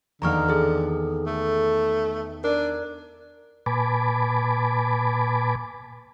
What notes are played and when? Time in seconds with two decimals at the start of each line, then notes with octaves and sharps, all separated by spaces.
0.22 E2 D3 D#3 A#3 A#5 C#6 F6
0.49 G#4 A4
1.27 A3
2.44 D4 A#4 D5
3.66 A#2 B4 G#5 A5 B5 D6